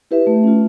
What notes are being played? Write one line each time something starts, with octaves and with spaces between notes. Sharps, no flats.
E4 G4 B4 E5
A3
C#4 F4